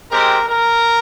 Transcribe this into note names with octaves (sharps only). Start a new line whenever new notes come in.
G#3 C4 G4 A#4
A#4